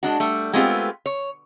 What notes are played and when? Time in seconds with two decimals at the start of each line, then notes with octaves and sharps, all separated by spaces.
0.03 G#3 D4 F#4
0.20 G3 A3
0.53 G#3 A3 B3 C4 F4 G4
1.06 C#5